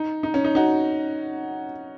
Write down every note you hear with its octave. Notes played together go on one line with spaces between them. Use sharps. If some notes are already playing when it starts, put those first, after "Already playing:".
Already playing: D#4
D#4
C#4
D#4
D#4 F#4